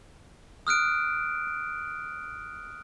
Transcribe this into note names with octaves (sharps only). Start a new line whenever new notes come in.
D#6 F6 F#6 D7